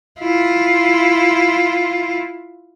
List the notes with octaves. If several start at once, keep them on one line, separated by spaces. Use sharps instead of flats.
E4 F4